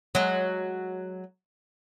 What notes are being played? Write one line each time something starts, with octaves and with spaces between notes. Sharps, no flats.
F#3 G#3